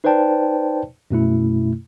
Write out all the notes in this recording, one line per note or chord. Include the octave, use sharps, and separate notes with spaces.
D#4 B4 C5 D5 G5 A5
F#2 B2 A3 E4